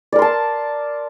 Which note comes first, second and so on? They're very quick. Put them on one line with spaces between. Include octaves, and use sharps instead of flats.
D5 A#4 C6 A5